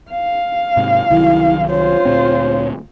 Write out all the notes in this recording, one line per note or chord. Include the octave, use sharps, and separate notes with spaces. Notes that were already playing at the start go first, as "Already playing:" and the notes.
F5
G#2 C3
C2 D#3 F#3 E4
F4 C5 C#5
D2 A#2 C4